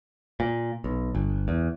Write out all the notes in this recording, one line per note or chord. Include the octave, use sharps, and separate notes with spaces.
A#2
B1
G1
E2